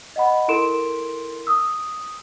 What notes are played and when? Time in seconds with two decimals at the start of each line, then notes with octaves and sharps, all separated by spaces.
0.16 D#5 F#5 B5
0.48 E4 A4 A#4 C6 D7 E7
1.47 D#6 E6